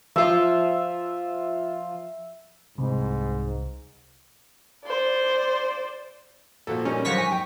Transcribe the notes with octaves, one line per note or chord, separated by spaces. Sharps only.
F3 F4 E5
C2 G#2
C5 D5
A#2 F3 F#4 A4
G3 C#4 D#4 A#4
D3 F3 F#3 C#6 A#6 B6
G#5
G5